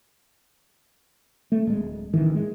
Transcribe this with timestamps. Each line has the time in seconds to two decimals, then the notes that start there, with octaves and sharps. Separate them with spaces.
1.52 A3
1.67 D1 G#3
2.14 A1 D#3 E3
2.35 G#3